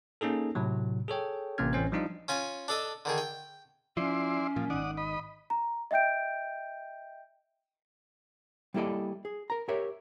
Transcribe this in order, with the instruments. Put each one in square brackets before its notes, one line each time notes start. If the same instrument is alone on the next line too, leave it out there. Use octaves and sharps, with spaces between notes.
[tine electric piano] A#3 C#4 D#4 G#4 A4
A2 C3 F#3
G#4 A4 C#5 G5
A1 C3 A#3 C#4 F6 G#6
A1 C4 C#4 C5
F3 G3 D4 D#4 F4 D#5
[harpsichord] C#4 F4 G#5
D4 A4 D#5
D3 D#3 G#4
G5
[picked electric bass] F3 [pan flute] C#4 [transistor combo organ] E4 D5 C6
[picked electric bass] A#2 [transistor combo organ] F3
[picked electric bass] G#1 D#3 [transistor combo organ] D5 F#5 D#6
[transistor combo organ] D#5 B5
[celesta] A#5
D#5 E5 G5 G6 D7
[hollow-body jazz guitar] G3 A#3 E4 A4 D5 D#5
G#4
A#4 A#5
G4 A#4 C#5 E5